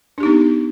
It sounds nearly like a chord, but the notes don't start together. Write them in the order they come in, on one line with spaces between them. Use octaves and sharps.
D4 G4 D#4 B3